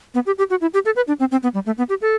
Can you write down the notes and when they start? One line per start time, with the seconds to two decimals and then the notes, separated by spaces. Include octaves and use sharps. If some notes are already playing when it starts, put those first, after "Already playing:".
0.14 B3
0.26 G4
0.38 G4
0.50 F#4
0.61 E4
0.74 G4
0.85 A4
0.96 B4
1.08 D4
1.20 C4
1.32 C4
1.43 B3
1.54 G3
1.66 A3
1.78 B3
1.89 G4
2.02 A4